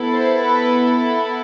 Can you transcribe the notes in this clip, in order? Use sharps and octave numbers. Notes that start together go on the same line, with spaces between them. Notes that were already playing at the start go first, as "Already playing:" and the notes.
Already playing: B3 E4 A4
C5
B4